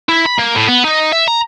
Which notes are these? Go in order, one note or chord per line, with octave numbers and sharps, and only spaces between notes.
E4
B5
A#3
A2
B3
D#4
E5
A#5